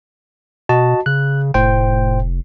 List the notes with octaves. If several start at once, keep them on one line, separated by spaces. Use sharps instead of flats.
B2 F#4 D#5 A5
C#3 F#6
F1 A2 C5 G5